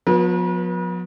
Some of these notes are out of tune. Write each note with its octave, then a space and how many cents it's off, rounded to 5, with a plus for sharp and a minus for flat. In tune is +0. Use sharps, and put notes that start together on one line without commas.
F3 +45 B3 -5 B4 -40